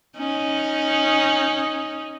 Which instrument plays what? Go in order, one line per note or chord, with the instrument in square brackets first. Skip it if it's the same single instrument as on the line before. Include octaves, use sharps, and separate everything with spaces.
[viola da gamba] C#4 D#4